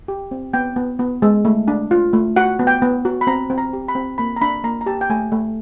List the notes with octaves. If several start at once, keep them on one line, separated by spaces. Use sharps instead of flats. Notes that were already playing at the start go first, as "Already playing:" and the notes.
G4
C4
B3 G5
B3
B3
G#3
A3
D4
F4
A3
F#4 F#5
B3
G5
B3
F#4
B5
C4 A#5
C4
A#5
G4
B5
C4
A#3 B5
A#5
D4 B5
A#3 A#5
A#5
G4 A5
G5
A3 G#5
A3